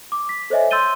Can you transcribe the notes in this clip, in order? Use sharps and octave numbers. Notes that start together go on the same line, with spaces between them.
D6
B6
A4 C5 C#5 D#5 E5 G#5
C6 E6 G6 A6 D#7 G7